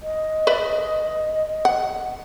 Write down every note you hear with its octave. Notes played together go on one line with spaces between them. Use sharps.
D#5
B4 D5 E5
F#5